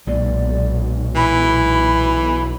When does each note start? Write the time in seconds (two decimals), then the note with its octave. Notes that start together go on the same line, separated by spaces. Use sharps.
0.07 B1 A#2 F#3 G#3 D5
1.16 E3 B5